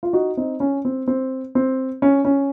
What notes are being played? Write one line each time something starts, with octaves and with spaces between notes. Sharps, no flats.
F4
D#4 F#4
C4 D#4
C#4
C4
C4
C4
C#4
C#4